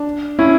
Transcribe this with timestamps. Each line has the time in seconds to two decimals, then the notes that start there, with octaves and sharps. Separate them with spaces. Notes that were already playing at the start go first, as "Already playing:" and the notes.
Already playing: D4
0.39 C#4 E4